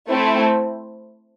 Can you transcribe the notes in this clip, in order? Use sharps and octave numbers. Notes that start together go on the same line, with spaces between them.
A3 C4 E4